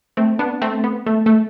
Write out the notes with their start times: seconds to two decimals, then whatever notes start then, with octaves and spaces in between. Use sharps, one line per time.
0.17 A3 C4
0.39 B3 D4
0.62 A3 C4
0.84 B3
1.06 A3
1.26 A3